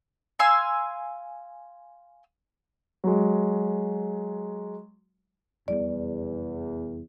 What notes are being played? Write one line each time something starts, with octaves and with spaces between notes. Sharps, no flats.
F5 G#5 C6 E6
F#3 G#3
F1 E2 G3 B3 D5